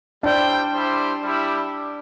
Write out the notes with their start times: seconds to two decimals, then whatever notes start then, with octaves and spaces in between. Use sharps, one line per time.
0.23 G3 D4 E4 C5 G5
0.74 G3 E4 G4 C5
1.23 G3 E4 G4